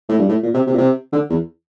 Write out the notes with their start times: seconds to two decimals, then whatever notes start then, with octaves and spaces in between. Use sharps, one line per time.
0.09 A2
0.19 G2
0.29 A2
0.43 A#2
0.54 C3
0.67 C3
0.73 A#2
0.78 C3
1.13 D3
1.30 E2